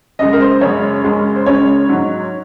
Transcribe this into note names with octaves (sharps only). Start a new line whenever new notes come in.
F#2 C#3 G#3 D#5
A#4
C5
F#2 C#3 G#3 C#5
F#2 C#3 G#3
C5
F#2 C#3 G#3 C#5
G#2 F#3